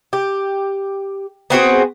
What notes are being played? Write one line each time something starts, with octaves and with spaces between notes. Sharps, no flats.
G4
B3 C4 F#4 G#4